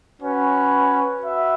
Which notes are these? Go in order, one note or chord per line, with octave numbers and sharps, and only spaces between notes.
C#4 F#4 B4
F#4 B4 E5